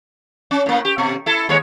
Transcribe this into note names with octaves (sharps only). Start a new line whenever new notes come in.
C#4
A2 A#3
G4
B2
E4 A4
D#2 G#3 C#5